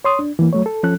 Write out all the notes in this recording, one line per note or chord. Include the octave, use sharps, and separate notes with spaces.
C#5 C6 D#6
D4
E3 A#3
F#3 A3 C#5
A4
F3 C#4 A4 F#6